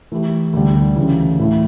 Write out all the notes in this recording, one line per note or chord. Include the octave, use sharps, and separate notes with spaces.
E3 A3 E4 G4
D2 D3 G3
D2 C#3 E3
A2 E3 A3 E4